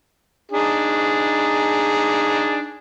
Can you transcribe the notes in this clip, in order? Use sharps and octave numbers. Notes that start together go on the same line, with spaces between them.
D4 D#4 G#4